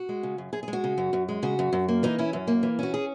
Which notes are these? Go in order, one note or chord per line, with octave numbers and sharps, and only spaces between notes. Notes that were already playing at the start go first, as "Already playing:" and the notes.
Already playing: F#4
G#3
C#3
F#2
F#2 G#4
G#4
G#3
F#4
C#3
F#2
F#2
G#3
C#3 F#4
F#2
F#2
A#3
E3 D#4
C#4 E4
F#2
A#3
E3
C#4 F#4
G#4